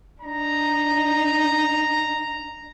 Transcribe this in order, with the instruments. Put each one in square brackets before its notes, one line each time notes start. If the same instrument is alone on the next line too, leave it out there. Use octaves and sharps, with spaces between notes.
[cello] D4 D#4 [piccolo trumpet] A#5